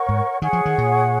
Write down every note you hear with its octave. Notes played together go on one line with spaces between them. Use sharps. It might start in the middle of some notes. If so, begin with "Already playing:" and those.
Already playing: A#4 C#5 F#5 C#6
G#2
D#3 G#4 C#5 F#5 C#6
F3
D#3
A#2